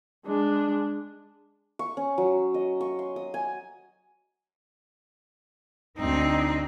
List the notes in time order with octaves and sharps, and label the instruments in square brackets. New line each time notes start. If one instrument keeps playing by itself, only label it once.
[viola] G#3 D4
[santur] C#6
C#4
F#3
D#5
C#6
C6
D#6
G#5
[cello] D2 C4 [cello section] D#4